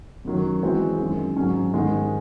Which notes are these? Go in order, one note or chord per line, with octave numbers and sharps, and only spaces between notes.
F#2 D#3 F#3
E3 G#3 C4 F#4
F#2 D#3 G#3
G#2 F#3 C#4
G#2 D#3 G#3